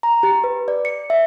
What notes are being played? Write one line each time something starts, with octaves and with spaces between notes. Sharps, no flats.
A#5
G4
B4
D5
C#7
E5